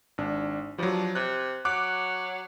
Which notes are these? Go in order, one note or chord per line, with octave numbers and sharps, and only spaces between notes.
G#1 D4
G2 F3 F#3
C3 F#6
F#3 D6 F#6